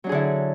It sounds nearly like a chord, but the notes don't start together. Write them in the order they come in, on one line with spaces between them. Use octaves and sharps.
F#3 D4 G#4 D3 E4